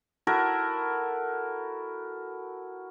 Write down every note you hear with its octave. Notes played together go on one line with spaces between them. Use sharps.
E4 F#4 A4 A#4